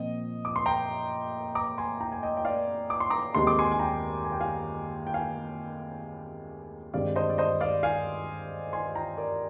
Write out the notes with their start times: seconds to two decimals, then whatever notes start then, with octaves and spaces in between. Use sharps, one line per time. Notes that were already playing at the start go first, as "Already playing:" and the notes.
Already playing: A#2 F3 C4 D#5
0.45 D6
0.56 C6
0.66 G5 A#5
1.55 A#5 D6
1.78 G#5 C6
2.00 G5 A#5
2.12 G#5
2.23 D#5 G5
2.37 G5
2.45 D5 F5
2.90 D6
3.00 C6
3.10 A#5 D6
3.35 D#2 D#3 G#3 C4 C6
3.47 D6
3.59 G#5 C6
3.72 G#5
3.79 G5 A#5
4.24 G#5
4.32 G5
4.40 F5 G#5
5.07 G5
5.14 F5 G#5
6.94 G2 D#3 G#3 C4 D5 F5
7.16 C5 D#5
7.30 D5
7.38 C5 D#5
7.61 D5 F5
7.83 F5 G#5
8.73 G#5 C6
8.95 G5 A#5
9.18 A#4 D5